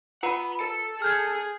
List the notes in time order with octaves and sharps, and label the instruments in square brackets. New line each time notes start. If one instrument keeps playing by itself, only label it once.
[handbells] F4 B4 A#5 [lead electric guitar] F#5 B5
[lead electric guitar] A4
[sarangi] G#4 [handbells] F6 G6 G#6